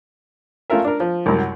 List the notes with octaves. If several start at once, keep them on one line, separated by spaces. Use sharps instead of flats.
A3 C#4 F4 A4 A#4 E5
D4 A#4
F3
C2 F#2
F#5